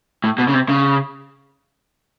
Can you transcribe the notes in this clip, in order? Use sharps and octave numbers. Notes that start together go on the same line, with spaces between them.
A2
B2
C#3
C3
C#3